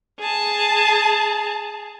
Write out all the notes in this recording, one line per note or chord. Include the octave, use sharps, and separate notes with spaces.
G#4 A5